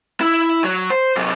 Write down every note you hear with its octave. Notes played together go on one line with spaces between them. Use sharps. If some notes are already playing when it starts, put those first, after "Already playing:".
E4
F#3
C5
C3 F#3